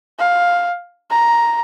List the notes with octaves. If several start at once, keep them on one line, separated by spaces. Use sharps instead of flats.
F5
A#5